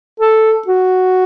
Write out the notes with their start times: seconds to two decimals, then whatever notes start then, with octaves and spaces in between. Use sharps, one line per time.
0.20 A4
0.67 F#4